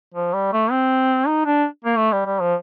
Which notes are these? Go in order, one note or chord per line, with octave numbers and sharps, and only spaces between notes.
F3
G3
A3
C4
D#4
D4
A#3
A3
G3
G3
F3